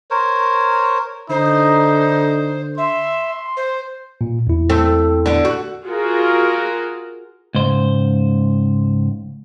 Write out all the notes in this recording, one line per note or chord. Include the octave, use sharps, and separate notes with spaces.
A#4 C5 C#5
D3 D#4 C5
E5 C6
C5
A#2
E2 E4
A3 C4
D3 B3
F#4
F4 F#4 G#4 A#4
C#2 G#2 C5